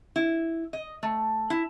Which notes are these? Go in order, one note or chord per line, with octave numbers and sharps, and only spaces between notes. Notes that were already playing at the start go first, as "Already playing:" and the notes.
E4
D#5
A3
E4